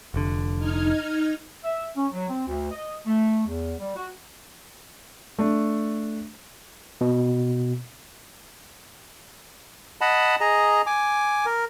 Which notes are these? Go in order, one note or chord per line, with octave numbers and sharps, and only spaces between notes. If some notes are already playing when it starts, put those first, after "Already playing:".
F1 D3
D#4 F6 G#6
E5
C#4
F#3
C4
D2
D#5
A3
E2
G3
F#4
A3 D4
B2
D#5 F#5 A5 B5
G#4 D#5 A#5
G#5 D6
A#4